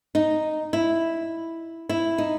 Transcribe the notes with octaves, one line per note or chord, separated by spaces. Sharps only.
D#4
E4
E4
D#4